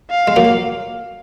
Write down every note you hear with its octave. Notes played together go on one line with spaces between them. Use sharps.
F5
G#3
F#3 A#3